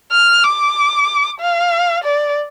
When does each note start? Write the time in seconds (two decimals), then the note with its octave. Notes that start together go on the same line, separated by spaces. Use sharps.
0.12 F6
0.44 D6
1.40 F5
2.04 D5